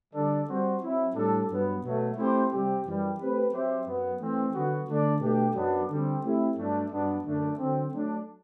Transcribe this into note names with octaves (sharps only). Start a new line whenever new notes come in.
D3 G3 D4 A4 D5
G3 C4 F#4 C5
F#3 C4 E4
A2 G3 D4 A4
G2 F#3 B3
B2 F#3 A3
A3 C4 E4 G4 C5
C3 G3 C4 G4
F#2 E3 G3
A3 C4 G4 B4
F#3 C4 G4 C5 E5
F#2 F#3 B3
E3 A3 C4
D3 F#3 B3 F#4
D3 A3 D4
B2 A3 D4 G4
F#2 F#3 B3 D4
D3 G3 C4
A3 C4 E4 G4
G2 F#3 A3 D4
G2 F#3 B3 D4
F#2 D3 A3 D4
D3 F#3 C4
F#3 A3 D4